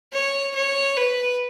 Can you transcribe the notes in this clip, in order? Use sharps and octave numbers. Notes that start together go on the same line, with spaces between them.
C#5
C#5
B4